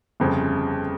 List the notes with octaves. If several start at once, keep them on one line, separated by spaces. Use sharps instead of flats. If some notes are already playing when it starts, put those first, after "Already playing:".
G1 F2 C#3